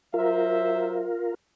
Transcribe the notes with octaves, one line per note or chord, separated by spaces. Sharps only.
F#3 F4 A#4 C5 E5